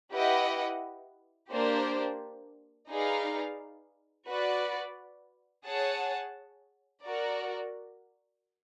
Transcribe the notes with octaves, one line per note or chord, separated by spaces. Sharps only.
E4 G4 B4 D#5 F#5
A#3 D4 G4 C5
D#4 G#4 B4 D5 F5
F#4 B4 D5
G#4 C#5 F#5 A5
F#4 A#4 D5